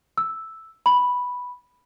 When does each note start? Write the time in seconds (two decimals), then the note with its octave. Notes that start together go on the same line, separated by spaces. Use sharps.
0.17 E6
0.86 B5